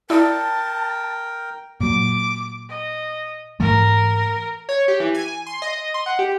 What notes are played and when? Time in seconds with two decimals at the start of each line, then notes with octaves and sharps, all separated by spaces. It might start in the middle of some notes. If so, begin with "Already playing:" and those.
0.10 E4 A#4 D5 G5 A5 D#6
1.80 A#2 F#3 D6
2.69 D#5
3.60 G#2 E3 A3 A#4
4.69 C#5
4.88 G4
5.00 E3
5.15 G#5
5.47 C6
5.62 D#5
5.94 C6
6.06 F#5
6.19 G4